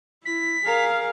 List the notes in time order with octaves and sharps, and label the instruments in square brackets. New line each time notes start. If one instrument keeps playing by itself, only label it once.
[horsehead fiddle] E4 [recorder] B6
[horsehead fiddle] G#4 F5 [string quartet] A#4